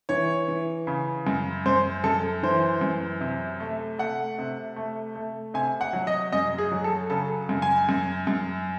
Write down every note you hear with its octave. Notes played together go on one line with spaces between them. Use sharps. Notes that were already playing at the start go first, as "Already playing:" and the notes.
E3 C#5
E3
C#3
F#2
F#2 C5
F#2 A4
E3 C5
F#2
C3
A3
A3 F#5
C3
A3
A3
C3 G#5
F#5
F#3
D#5
F#2 D#5
G#4
F#3
A4
C#3 A4
F#2
G#5
F#2
F#2